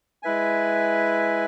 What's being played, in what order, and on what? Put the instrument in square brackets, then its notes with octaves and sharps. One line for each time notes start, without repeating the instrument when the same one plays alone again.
[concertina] G#3 E4 B4 E5 G#5